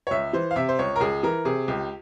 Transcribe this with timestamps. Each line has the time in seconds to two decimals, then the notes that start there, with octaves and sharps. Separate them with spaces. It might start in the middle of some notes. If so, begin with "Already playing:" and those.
0.07 C#5
0.11 C#2 E5
0.33 E3 C5
0.51 F5
0.56 C3 E5
0.69 C5
0.79 C#2 C#5
0.96 A#4
1.00 C#2 G#4
1.23 E3 A#4
1.45 C3 G#4
1.68 C#2 G4